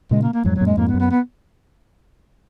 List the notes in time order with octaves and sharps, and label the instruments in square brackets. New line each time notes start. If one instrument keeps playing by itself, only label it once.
[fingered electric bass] A#2 C#3 [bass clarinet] G#3
[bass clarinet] A#3
A#3
[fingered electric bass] F2 G#2 [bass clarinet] F#3
[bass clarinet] F#3
[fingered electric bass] F#2 A#2
[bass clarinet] G#3
[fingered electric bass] F2 G#2 [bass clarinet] A#3
[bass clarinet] B3
[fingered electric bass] F#2
[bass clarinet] B3
B3